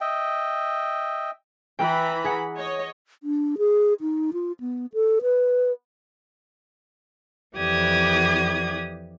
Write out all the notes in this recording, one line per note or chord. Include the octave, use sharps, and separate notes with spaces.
D#5 E5 G5
E3 G5 A#5 B5 F#6
G#4 F#5
C#5 D#5
D4
G#4
D#4
F4
B3
A4
B4
F2 E3 G4 D5 D#6 G#6